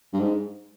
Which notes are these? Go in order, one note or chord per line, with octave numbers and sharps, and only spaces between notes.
G2
G#2